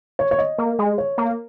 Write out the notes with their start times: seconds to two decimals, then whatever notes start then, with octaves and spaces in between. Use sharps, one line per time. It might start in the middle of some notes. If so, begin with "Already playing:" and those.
0.19 C#5
0.31 C#5
0.39 D#5
0.58 A#3
0.79 G#3
0.98 C#5
1.18 A#3